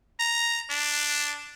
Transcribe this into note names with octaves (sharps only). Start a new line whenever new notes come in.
A#5
D4